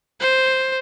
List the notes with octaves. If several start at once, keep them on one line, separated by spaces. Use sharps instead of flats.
C5